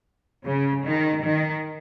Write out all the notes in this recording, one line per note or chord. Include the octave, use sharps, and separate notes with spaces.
C#3
D#3
D#3